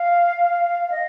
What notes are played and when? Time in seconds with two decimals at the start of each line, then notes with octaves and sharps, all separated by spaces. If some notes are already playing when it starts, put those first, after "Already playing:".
Already playing: F5
0.88 F5
0.91 D#5